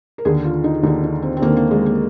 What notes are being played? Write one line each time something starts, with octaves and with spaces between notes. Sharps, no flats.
A#4
D#2 D3 G#4
F4
D#4
D#2 D3 D#4
D#4
C4
C4
D#2 D3 A#3
A#3
G#3
A#3